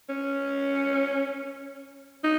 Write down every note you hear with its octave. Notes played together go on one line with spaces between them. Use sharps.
C#4
D#4